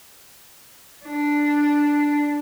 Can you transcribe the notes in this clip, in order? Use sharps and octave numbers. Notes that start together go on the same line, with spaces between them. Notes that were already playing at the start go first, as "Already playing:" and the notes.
D4